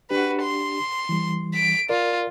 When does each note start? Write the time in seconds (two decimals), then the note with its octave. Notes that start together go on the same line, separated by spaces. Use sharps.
0.11 D4 F#4 G4 B4
0.42 C6
1.09 E3 G3
1.54 B6 D7
1.89 F4 A#4 D5